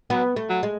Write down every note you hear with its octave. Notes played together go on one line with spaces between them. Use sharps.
F#3 B3
A3
F#3
G#3